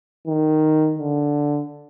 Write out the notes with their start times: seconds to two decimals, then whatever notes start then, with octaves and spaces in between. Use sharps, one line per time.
0.27 D#3
0.98 D3